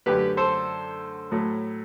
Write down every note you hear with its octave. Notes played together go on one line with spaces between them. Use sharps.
F#2 D3 A3 G4 B4
A4 C5
A2 F#3 A3